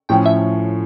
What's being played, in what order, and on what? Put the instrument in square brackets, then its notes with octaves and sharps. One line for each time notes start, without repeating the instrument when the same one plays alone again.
[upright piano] A2 F3 C#4 [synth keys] G5
[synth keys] E5